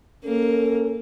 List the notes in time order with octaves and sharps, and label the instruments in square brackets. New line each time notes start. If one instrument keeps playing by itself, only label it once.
[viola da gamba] A#3 [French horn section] C#4 A#4 [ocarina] A4